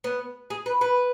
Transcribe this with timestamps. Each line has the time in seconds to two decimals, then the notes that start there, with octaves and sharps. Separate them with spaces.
0.04 B3
0.50 G#4
0.66 B4
0.81 B4